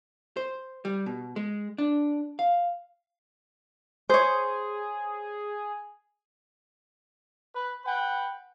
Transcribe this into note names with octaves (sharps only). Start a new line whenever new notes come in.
C5
G3
B2
G#3
D4
F5
G#4 C5 C#5
B4
B4 F#5 G5